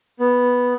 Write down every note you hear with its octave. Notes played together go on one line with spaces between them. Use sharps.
B3